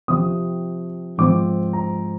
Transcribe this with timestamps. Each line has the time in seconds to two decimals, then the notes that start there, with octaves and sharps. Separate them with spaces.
0.08 C3 F3 C4 D#6
1.18 G#2 F3 C4 D6
1.73 A#5